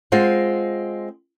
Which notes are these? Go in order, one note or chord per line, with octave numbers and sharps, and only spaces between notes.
G#3 C4 F4 C5 F#5